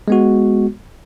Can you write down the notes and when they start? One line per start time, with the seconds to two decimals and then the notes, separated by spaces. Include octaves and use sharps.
0.08 G#3 B3 F#4